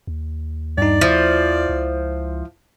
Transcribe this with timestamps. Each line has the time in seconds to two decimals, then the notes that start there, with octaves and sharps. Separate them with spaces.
0.07 D#2
0.78 G2 D#4 D5
1.01 F3 E4 E5
1.69 C#2